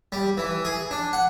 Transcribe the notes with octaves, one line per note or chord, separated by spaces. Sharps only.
G3
E3
G#4
D4
F#5